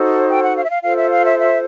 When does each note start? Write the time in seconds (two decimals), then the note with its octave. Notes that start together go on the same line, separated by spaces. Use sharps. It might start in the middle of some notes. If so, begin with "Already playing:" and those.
Already playing: D#4 F#4 A4 C5
0.30 G5
0.43 F#5
0.57 F5
0.64 E5
0.70 F5
0.83 F4 A4 C5 F5
0.98 E5
1.11 F5
1.25 E5
1.39 E5